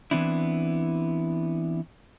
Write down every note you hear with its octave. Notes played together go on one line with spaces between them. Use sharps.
E3 B3 C4 D4 E4